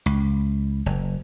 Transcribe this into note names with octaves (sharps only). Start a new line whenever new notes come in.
C#2
F#1